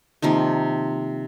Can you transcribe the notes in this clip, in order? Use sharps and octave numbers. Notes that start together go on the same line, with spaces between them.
C3 D#3 F3 A#3